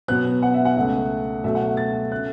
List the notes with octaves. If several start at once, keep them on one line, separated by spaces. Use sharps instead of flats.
B2 F#3 B3 F#6
F#5
E5
F#5
C#2 C#3 A3
B2 F#3 A3 E5
F#5
A6
C#3 A3 F#6